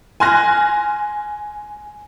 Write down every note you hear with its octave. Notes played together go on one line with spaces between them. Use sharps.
G#5 C6 F6 F#6 A#6